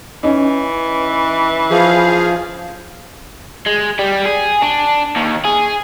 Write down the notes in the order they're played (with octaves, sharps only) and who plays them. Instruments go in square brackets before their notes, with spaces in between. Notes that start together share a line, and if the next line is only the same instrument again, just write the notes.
[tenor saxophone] E3 [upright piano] C#4 D#4
[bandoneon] F3 [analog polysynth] G#4 F5
[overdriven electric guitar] G#3
G3
G#4
D4
D#2
G#4